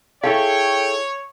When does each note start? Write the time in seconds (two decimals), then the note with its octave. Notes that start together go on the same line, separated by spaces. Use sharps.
0.24 E4 G#4 A4 C#5 F5 G5